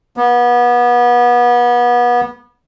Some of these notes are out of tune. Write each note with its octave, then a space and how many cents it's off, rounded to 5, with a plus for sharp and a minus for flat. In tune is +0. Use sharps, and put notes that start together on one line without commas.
B3 -30